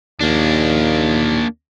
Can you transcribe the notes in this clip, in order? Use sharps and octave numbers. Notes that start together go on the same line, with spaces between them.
D#2 A#3 D4